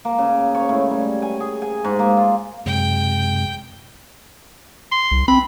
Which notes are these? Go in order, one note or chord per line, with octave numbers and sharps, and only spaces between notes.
A#3
C#3
C#5
A2
G3
G#5
G#4
G#5
G#2
A#3
F4
F#2 C3 G#3 G5
C6
C2
C4 B5